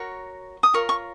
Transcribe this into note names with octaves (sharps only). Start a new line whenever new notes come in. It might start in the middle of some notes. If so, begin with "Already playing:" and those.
Already playing: F#4 A#4 C#5
D#6
F4 A#4 C#5 C#6
C#6